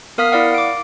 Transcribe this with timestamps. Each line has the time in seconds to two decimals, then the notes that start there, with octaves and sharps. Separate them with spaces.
0.18 B3 A#4 F5 D#6 F6 B6
0.32 E4 D5 F5 F#5
0.54 D6 D7